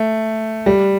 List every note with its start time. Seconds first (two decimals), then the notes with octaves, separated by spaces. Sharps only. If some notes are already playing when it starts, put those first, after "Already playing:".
Already playing: A3
0.66 G3